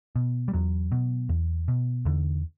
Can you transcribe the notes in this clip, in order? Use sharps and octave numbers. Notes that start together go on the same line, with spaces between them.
B2
G3
E2 F#3
B2
E2
B2
E2 D3